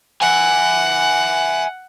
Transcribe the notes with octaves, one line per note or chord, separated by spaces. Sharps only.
E5 F#5 G#5